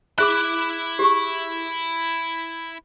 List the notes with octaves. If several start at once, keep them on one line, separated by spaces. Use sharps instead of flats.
E4 G#4 E5 B5 D6 F#6
G4 G#4 C#6